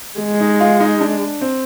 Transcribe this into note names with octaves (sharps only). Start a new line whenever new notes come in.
G#3
D#4
F4
D#4
D4
C4